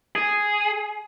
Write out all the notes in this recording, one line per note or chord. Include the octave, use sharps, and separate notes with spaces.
G#4